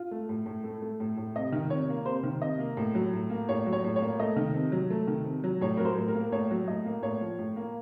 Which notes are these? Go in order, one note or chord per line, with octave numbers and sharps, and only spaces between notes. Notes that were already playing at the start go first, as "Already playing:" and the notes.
Already playing: F4
A3
A2
A2
A3
A3
A2
A2
C3 D#5
D#3
C3 C#5
A#3
C3 C5
D#3
C3 D#5
A#3
A2
F#3
A2
A#3
A2 C#5
F#3
C#5
A2
C#5
A#3
A3 D#5
D#3
C3
F#3
A3
D#3
C3
F#3
A2 C#5
F#3 A#4
C5
A2
A#4
A#3
A2 C#5
F#3
A2 D#5
A#3
A2 C#5
F3
A2
A#3